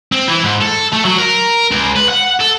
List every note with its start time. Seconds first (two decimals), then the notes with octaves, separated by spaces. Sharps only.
0.12 C4
0.28 E3
0.44 G#2
0.62 A4
0.93 A3
1.05 F#3
1.18 A#4
1.71 C#2
1.96 B4
2.09 F#5
2.40 A4